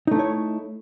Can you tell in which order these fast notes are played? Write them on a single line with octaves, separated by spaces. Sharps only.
D#4 A3 E4 C#5